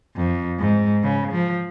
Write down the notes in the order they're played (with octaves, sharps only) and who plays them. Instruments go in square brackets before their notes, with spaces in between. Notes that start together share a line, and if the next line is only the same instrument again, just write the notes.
[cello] F2
G#2
C#3
F3